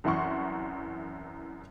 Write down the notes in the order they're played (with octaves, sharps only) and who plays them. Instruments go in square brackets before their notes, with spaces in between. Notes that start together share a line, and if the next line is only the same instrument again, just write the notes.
[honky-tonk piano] C2 F#2 E3 F#5 C6 C#6